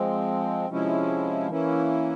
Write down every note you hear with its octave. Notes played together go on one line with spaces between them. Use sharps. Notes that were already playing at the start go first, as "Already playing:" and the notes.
Already playing: F3 G#3 C4
C3 F3 G#3 C#4 E4
E3 A#3 C#4 E4